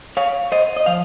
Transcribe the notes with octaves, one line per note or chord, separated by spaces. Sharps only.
C#5 F5
C5 D#5
D#5
F3 F5